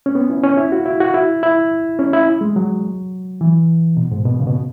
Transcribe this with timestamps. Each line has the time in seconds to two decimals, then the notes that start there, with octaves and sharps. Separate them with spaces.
0.06 C#4
0.15 B3
0.30 E4
0.44 C#4
0.57 E4
0.72 F#4
0.86 E4
1.00 F#4
1.14 E4
1.43 E4
1.99 C#4
2.13 E4
2.41 G#3
2.56 F#3
3.41 E3
3.97 B2
4.11 G#2
4.25 B2
4.39 C#3
4.47 B2